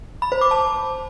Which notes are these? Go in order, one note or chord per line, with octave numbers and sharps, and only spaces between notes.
B5
C5
D6
A5